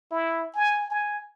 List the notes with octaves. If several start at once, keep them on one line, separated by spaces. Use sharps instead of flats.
E4
G#5
G#5